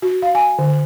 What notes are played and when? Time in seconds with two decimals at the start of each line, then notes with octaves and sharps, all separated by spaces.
0.02 F#4
0.22 F5
0.35 G#5
0.59 D3